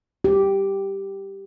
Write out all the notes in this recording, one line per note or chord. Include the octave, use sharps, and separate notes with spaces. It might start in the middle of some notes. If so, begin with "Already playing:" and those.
G4